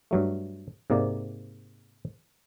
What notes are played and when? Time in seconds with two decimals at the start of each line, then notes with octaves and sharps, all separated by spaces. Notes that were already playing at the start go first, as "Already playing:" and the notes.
0.11 G2 F#3 A3
0.90 G#2 C3 A#3 D5